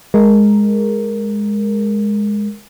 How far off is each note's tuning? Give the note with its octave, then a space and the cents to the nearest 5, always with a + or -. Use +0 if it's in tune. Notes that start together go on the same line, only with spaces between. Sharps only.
G#3 +0 A#4 +0